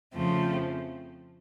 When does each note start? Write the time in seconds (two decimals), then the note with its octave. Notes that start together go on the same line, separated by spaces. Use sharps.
0.13 F2 C#3 F3 A3 C4